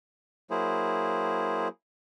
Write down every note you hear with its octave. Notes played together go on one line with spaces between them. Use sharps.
F#3 A#3 E4 G#4 C5